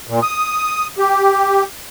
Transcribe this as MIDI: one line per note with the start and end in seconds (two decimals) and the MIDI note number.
0.07 0.20 46
0.22 0.87 87
0.99 1.64 67